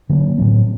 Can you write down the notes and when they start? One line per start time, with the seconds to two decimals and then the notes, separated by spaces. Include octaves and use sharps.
0.09 D3 F#3 A#3
0.38 A2 F#3 C4